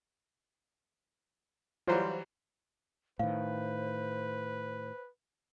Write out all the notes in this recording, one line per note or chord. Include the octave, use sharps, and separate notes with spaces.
E3 F#3 G3 F4 C5
A2 D#3 B4 C5 F5